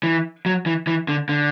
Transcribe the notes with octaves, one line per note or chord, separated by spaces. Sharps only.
E3
F#3
E3
E3
D3
D3